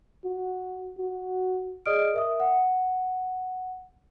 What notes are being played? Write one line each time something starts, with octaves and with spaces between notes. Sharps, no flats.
F#4
F#4
G#4 D5 D#5 D#6 F6 D7
A#4 E5 D#6
F#5